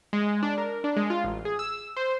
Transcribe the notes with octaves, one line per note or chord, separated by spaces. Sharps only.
G#3
D4
A#4
D4
G#3
F4
A1
G#4
E6
C5